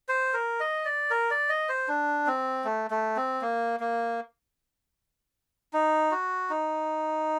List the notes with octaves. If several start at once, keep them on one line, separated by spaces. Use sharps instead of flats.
C5
A#4
D#5
D5
A#4
D5
D#5
C5
D4
C4
A3
A3
C4
A#3
A#3
D#4
F#4
D#4